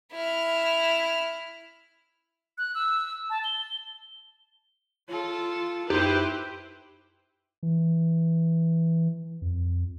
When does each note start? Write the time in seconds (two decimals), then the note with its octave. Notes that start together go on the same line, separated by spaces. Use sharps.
0.12 E4 F6
2.58 F#6
2.75 E6
3.30 A5
3.44 G7
5.09 F4 A4 C#5
5.90 F#2 D#4 E4 G4 B4 C5
7.63 E3
9.42 F2